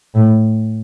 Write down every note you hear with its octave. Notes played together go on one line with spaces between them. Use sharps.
A2